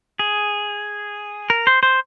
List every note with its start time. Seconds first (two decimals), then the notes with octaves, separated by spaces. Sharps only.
0.19 G#4
1.50 A#4
1.67 C5
1.83 C5